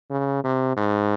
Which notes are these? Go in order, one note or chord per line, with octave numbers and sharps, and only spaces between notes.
C#3
C3
G#2